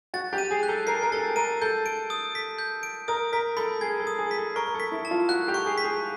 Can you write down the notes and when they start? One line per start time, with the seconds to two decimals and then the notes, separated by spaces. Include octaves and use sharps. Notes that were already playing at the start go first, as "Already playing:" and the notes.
0.14 F#4 A6
0.33 G4
0.38 D#7
0.51 G#4
0.63 F#6
0.69 A4
0.87 A#4 C7
1.02 A#4
1.12 A4 A6
1.36 A#4 D#7
1.62 A4 G6
1.86 D7
2.10 D#6
2.35 B6
2.58 G6
2.83 D7
3.08 A#4 D#6
3.32 A#4 B6
3.57 A4 B5
3.81 G#4 G#6
4.00 A4
4.07 D#6
4.19 G#4
4.31 B6
4.38 A4
4.55 A#4 C#6
4.67 A#4
4.74 A4
4.80 B6
4.92 E4
5.05 A5
5.11 F4
5.29 F#4 F#6
5.48 G4
5.54 C#6
5.66 G#4
5.78 B6
5.84 G#4